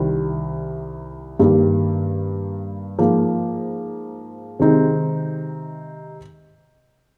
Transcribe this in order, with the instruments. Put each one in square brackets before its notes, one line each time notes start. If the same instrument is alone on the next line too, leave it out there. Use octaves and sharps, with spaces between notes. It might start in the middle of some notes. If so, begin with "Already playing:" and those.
Already playing: [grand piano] C2 C3 D#3 G3
G2 D#3 G3 A#3
G#2 F3 A#3
C3 D#3 G#3 C4 D#4